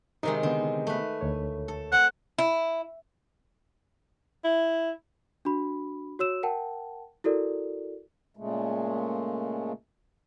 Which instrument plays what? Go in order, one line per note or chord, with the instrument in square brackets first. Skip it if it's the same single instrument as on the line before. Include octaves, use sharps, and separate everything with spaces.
[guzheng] C3 D#3 G#3 [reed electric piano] D#4
[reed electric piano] D3 D#3 B3 [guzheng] C4
[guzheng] A3 B4
[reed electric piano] D2 C#5
[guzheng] A4
[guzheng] C4 [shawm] F#5
[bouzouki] E4
[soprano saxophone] E4
[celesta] D4 F#4 B5
F#4 C#5 E6 E7
A#4 F#5 G5 A5
E4 F#4 A4 A#4 D5
[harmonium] A#2 C#3 G#3 A3